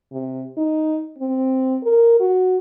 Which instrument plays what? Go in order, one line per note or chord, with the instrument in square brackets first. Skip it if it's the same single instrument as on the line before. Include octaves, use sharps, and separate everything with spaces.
[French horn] C3
D#4
C4
A#4
F#4